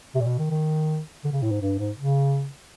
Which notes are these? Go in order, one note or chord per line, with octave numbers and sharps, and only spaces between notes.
C3
A#2
B2
D#3
D#3
D3
C#3
A2
G#2
G2
G#2
C#3